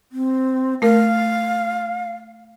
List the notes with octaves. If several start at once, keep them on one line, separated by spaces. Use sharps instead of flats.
C4
A3 A#4 F5